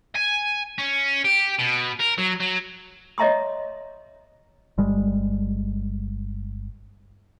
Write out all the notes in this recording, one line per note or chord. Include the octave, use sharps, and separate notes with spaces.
G#5
C#4
G4
B2
A#4
F#3
F#3
C#5 D#5 E5 A#5 C6 D#6
G1 G3 G#3